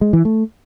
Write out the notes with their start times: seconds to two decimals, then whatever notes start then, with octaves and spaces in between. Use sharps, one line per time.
0.01 G#3
0.13 E3
0.25 A3